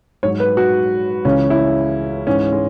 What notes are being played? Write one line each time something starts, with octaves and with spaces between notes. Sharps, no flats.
G#2 F#3 C#5
B4
F#4
C#2 C#3 E3 C#4
E4
G#2 E3 C#4
G#3